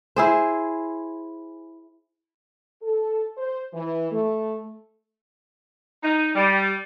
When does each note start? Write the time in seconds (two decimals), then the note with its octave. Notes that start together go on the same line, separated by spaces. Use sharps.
0.16 E4 G#4 C5
2.83 A4
3.37 C5
3.73 E3
4.11 A3
6.03 D#4
6.35 G3